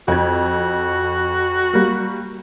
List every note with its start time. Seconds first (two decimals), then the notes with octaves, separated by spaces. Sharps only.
0.08 F2 F#4 G#6
1.74 G3 A#3